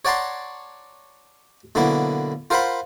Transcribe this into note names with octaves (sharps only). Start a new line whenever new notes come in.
C#5 D5 F#5 A5 A#5 C6
B2 D3 F#3 A#3 E4
F4 A#4 C5 F5 F#5 B5